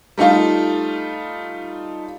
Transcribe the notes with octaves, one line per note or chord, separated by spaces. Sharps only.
G3 A3 D#4 F4